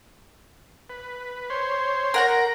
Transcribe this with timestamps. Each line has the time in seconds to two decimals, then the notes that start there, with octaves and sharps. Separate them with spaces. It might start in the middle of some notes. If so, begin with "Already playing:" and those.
0.90 B4
1.50 C5 C#5 C6
2.14 A#4 F#5 A#5